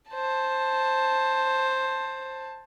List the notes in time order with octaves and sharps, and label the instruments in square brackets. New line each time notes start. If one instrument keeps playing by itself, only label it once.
[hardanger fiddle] C5 A5